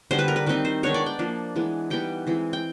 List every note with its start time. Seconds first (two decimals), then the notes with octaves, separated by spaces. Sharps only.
0.11 D3 G3 B3 C5
0.19 B4
0.28 A#4
0.36 B4
0.46 D#3 G3 C4 D#4 B4
0.65 C5
0.83 D#3 G#3 B3 D4 C#5
0.94 D5
1.06 G5
1.19 F3 A#3 D4
1.56 E3 G#3 B3
1.90 E3 G3 B3 D#4 G5
2.27 E3 G#3 C4
2.53 G5